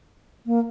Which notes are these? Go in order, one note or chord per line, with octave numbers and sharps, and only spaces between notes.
A#3